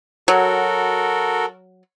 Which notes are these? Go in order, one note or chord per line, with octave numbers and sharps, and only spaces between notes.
F#3 F#4 A4 A#4